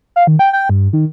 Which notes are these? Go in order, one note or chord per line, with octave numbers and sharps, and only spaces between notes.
F5
D#3
G5
G5
G2
D#3